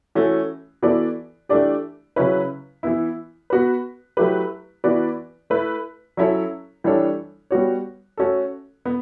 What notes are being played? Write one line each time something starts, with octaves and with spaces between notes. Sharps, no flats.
E3 A3 C#4 F#4
E3 B3 F#4 A4 D5
E3 A3 D4 G4 D5
C#3 F#3 C#4 E4 B4
E3 B3 E4
B3 F#4 B4
F#3 A3 E4 G4 B4
E3 B3 F#4 B4 D5
A3 E4 B4
F#3 C#4 E4 A4 C#5
E3 G3 D4 A4 C#5
G3 B3 F#4 C#5
A3 C#4 F#4 A4
B3